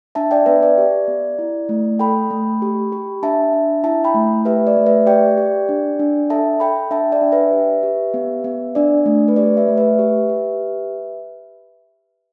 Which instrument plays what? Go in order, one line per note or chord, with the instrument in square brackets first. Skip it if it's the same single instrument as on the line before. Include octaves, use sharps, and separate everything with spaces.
[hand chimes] D4 E5 A5
D5 G5
B3 B4 E5
D5
G4
B3
E4
A3
A4 G5 B5
A3
G4
G4
D4 E5 A5
D4
E4 E5 A5
G5 B5
A3
G4 B4 E5
D5
A3
B4 E5
G4 D5 G5
G4
D4
D4
A4 E5 A5
A4 G5 B5
D4 E5 A5
D5 G5
D4
B4 E5
G4
G4
B3
B3
D4 D5
A3
B4
G4 D5
B4 E5
A3
B4 E5
G4
G4